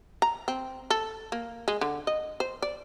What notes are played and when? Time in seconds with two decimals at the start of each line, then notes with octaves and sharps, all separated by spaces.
0.22 A#5
0.48 C4
0.90 A4
1.32 A#3
1.68 G#3
1.81 D3
2.07 D#5
2.40 C5
2.62 D5